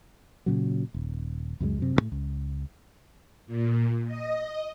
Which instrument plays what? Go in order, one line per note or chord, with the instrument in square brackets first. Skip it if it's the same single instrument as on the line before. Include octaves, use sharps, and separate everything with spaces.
[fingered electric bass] A#2 C#3 F#3
D#1
C#2 F#2 F3 G#3
F#2 C3
A1 A2
C#2
[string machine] A#2
D#5